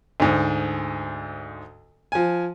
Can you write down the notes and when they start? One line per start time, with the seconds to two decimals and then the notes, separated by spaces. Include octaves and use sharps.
0.20 D2 G#2
2.12 F3 G#5